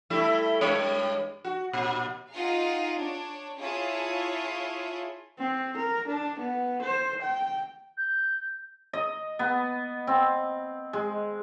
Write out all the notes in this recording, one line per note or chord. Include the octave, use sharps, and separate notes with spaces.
G3 A3 E4
G2 G#3 C#5
F#4
A#2
D#4 F4 G#4 F5 F#5 A#5
D4 C#5
E4 F4 G#4 C#5 A5
C4
A#4
D4
B3
C5
G5
G6
D#5
B3
C4
G#3